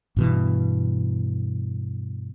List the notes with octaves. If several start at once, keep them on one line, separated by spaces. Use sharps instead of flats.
G2 B2 E3